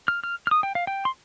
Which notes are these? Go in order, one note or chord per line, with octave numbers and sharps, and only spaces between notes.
F6
F6
F6
D#6
G5
F5
G5
C6